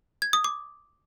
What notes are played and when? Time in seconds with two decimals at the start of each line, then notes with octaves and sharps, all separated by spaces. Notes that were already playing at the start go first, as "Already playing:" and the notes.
0.22 G#6
0.33 D#6
0.44 D6